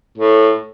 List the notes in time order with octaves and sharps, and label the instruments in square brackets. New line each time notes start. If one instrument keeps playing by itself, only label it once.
[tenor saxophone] A2